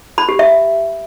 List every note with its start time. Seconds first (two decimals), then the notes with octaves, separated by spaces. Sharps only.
0.18 B5
0.29 G4
0.39 E5